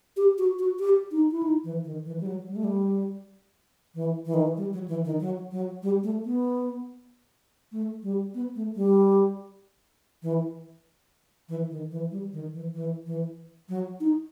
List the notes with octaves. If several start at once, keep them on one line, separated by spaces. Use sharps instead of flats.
G4
F#4
F#4
G4
D#4
E4
D#4
E3
D#3
E3
G3
F#3
G3
A3
G3
E3
E3
D#3
E3
G3
F#3
E3
D#3
F#3
F#3
G3
A3
B3
A3
G3
B3
A3
G3
E3
E3
D#3
E3
G3
D#3
E3
E3
E3
F#3
D#4